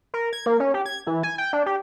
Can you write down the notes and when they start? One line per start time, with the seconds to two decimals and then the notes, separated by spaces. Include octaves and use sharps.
0.14 A#4
0.33 G#6
0.46 A#3
0.60 C#4
0.74 G4
0.86 G#6
1.07 E3
1.23 G#5
1.38 G5
1.53 D4
1.66 G4